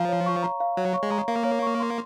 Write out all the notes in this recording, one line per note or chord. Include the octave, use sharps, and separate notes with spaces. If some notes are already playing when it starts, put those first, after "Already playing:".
Already playing: F3 F5 A#5
C#5
C#6
A#5
F5
F#3 C#5
C#6
G#3
A#5
A#3 F5
C#5
C#6
C6